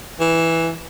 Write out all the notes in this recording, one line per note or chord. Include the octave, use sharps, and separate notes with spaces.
E3